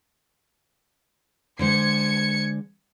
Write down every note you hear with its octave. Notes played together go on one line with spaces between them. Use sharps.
D3 G#3 C5 G#6 C#7